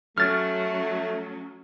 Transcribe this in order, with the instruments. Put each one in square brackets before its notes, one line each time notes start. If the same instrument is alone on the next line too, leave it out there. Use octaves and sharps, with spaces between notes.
[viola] F#3 [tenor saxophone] A3 [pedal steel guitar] C#4 [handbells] F6 A6